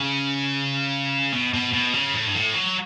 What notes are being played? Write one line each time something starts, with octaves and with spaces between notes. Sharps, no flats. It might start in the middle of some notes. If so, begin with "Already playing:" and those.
Already playing: C#3
B2
B2
B2
C#3
A2
G2
A2
F#3